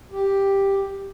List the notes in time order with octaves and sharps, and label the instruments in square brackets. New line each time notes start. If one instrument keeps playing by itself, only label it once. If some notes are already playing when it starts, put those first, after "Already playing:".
[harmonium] G4